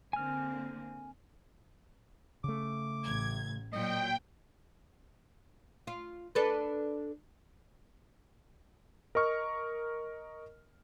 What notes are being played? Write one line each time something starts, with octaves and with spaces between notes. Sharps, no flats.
D3 A#3 C4 G#5 F6
C#3 A3 D6
A1 G#6
A#2 F#3 D#5 G5
F4
D4 A4 B4
A#4 D#5 C#6 F6